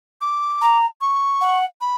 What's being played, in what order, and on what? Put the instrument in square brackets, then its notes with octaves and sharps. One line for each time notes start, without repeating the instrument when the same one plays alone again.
[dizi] D6
[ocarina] A#5
[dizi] C#6
[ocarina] F#5
[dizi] B5